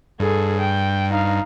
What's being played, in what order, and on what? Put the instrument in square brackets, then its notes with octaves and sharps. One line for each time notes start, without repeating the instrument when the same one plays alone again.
[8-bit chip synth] G2 [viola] G#4 A4
[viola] G5
D#4 F5